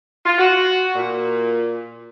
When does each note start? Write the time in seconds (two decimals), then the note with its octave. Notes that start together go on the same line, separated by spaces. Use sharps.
0.25 F4
0.39 F#4
0.96 A#2